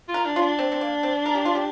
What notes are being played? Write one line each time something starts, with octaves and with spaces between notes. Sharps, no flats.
F4
A#4
D4
F4
D4
C4
C4
A#3
C4
A#4
G4
F4
G4